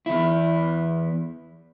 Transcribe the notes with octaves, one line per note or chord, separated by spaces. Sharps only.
E2 E4